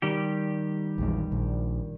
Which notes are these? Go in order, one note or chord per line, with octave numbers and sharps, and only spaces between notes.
D#3 G3 G4
A#1 E2 G#3
A#1